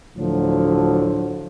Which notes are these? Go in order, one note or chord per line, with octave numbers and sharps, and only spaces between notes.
D2 A2 D3 F3 F#3